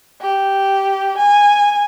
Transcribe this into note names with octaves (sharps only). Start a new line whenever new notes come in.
G4
G#5